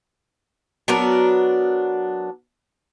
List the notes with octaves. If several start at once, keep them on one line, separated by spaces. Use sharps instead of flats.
F#3 B3 D4 A#4